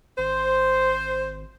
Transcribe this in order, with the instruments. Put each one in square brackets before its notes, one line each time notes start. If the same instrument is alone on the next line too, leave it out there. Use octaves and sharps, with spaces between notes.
[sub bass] G#1 [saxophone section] C5